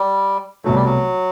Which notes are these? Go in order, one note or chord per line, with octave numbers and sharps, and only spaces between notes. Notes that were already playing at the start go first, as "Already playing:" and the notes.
Already playing: G3
C2 B2 F#3 A3
G3
F#3